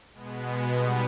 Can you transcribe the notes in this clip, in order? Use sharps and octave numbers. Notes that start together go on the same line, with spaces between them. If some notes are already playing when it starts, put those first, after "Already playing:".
B2 G#3 B3
B2 G3 B3 D#4